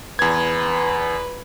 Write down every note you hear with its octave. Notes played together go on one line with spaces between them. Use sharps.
E2 B4 G#6